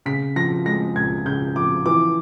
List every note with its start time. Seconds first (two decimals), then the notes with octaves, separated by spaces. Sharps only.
0.06 C#3 B6
0.36 F3 A#6
0.66 G#3 A#6
0.96 C#2 G#6
1.26 C#3 G6
1.56 F3 D6
1.86 E3 D6